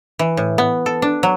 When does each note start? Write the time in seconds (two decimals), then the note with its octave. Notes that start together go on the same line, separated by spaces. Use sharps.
0.19 E3
0.37 A2
0.58 B3
0.86 A4
1.02 D4
1.23 F#3